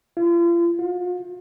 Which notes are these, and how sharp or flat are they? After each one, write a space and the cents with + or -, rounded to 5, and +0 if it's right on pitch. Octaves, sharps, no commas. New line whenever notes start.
F4 -40
F4 +40